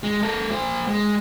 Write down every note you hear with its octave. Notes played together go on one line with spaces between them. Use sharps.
G#3
A#3 A4
A#3 C5
G#3